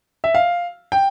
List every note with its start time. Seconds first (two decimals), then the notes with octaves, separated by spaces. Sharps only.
0.24 E5
0.35 F5
0.92 G5